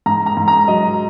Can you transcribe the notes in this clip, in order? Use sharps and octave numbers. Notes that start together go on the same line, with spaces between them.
G#2 A#5
A#5
G#2
A#5
F#3 D#5